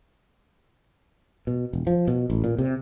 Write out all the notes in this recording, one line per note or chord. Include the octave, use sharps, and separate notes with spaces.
B2
E1
F3
B2
A1
A#2
C3